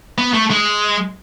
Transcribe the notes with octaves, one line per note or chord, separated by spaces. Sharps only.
B3
A3
G#3